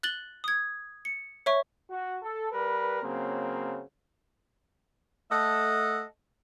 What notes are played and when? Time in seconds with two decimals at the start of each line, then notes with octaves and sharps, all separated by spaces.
0.03 F#6 A6 F#7 G7
0.44 D#6 G#6
1.05 C#7
1.46 C#5 E5 C#6
1.90 F#4
2.22 A4
2.52 G3 A#4 B4
3.02 C#3 F#3 A#3 C4
5.31 A3 A4 D#5 E5 F#5